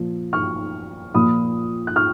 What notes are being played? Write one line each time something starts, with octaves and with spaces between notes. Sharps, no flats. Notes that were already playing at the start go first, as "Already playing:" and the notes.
Already playing: A#2 F3
C#6 F6
A#2 F3 B5 D#6
F#6
C#6 F6